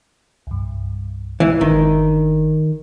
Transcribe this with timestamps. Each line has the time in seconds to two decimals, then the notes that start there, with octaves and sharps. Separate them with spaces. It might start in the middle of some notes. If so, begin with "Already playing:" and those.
0.47 C2 G2
1.40 E3 G#3
1.61 G1 D#3 D4